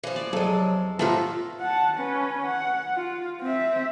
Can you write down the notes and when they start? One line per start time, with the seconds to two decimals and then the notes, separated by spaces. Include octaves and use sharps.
0.03 E3 F3
0.16 D5
0.33 E2 C3 F3 F#3 G#3 A4
0.99 A2 C3 A3 B3 F4 A4 A#5
1.61 F#5 A5
1.97 C#4 B4
2.45 F#5
2.96 F4
3.42 C4 E5